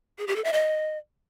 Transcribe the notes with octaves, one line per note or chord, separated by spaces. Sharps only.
G#4
G4
A4
E5
D#5